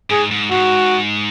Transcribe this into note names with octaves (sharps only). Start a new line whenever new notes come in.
G#2 G#4
G#2
G#2 F#4